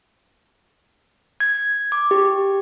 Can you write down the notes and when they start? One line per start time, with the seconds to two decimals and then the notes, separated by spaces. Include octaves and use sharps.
1.40 G#6
1.92 D6
2.11 G4